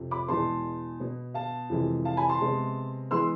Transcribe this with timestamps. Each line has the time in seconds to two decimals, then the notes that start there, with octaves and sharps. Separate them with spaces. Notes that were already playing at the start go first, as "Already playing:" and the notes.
Already playing: F2 C3 F3
0.11 B5 D6
0.28 E2 B2 G#3 B3 A5 C6
1.00 B2 B3
1.34 F5 A5
1.70 F2 C3 E3 G#3
2.05 F5 A5
2.17 G#5 B5
2.29 A5 C6
2.40 C3 G#3 B3
3.11 E3 G#3 B3 C6 E6